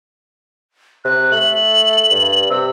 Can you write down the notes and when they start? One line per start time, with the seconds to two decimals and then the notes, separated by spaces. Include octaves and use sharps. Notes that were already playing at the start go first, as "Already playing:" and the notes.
1.05 C3 F#6
1.32 A3 F#7
2.11 G2
2.50 C3 E6